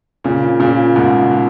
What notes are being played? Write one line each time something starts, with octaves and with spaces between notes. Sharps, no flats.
A#2 C#3
A#2 C#3
G#2 B2
B2